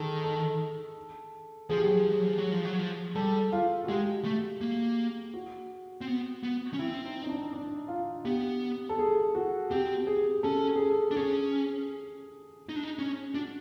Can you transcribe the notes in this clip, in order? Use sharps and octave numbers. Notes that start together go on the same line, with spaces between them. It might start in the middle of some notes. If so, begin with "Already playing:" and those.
Already playing: D#3 G#4 A4
A4
F3 G#4
G4
F#3 G#4
F3
F#3
F3
F#3
F3
F#3
F3
G3 A4
F4
F#4
G#3 G4
A3
A#3
F#4
C4
B3
B3
C#4
C4 E4
D#4
D#4
D4
D4
F4
B3 G4
A4
G#4
F#4
C4 G4
G#4
C#4 A4
G#4
A4
D4
C#4 G#4
D#4
D4
D#4
C#4
D4 F#4